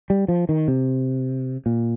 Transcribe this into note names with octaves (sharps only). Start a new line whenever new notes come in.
G3
F3
D#3
C3
A#2